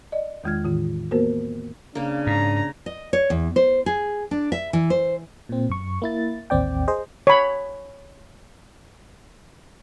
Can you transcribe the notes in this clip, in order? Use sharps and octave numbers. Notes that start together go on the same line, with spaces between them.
D5 D#5
E2 D#3 G#3 F4 F6 G#6
A2 D#3 E3 F4
A#3 B3 F#4 A#4 C5
C#3 A#3 D4
G#2 A#5
D#5
C#5
E2
C5
G#4
D4
E5
E3
C5
A#2 C4
F#2 C#6
A#3 E4 A6
A1 D#2 C4 D5 G5
G#4 C5 D#5
C#5 B5